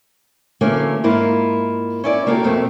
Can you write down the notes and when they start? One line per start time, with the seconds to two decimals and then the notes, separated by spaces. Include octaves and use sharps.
0.61 D3 E3 F#3 A3 A#3 C#4
1.04 G#2 A#3 E4 F4
2.04 C#4 E4 D5
2.26 C#3 A#3 E4 F#4 G4 A4
2.43 F2 B2 A3 A#3 C4